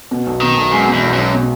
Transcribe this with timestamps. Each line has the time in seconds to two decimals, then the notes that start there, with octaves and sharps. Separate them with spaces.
0.11 B2
0.27 B1
0.42 B2 D#3
0.57 B1
0.72 F#2 G#3
0.88 B2
0.93 E2
1.03 B1
1.13 B1 F#2
1.34 B2